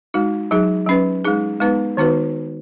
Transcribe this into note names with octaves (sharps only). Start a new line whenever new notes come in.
G#3 D#4 F#4
F#3 D#4 G#4
F#3 C#4 B4
G#3 D#4 G#4
G#3 B3 D#4 B4
D#3 B3 D#4 F#4 B4